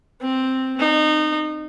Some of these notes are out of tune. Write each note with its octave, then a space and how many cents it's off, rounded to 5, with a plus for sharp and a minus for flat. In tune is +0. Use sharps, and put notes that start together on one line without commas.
C4 +0
D#4 -25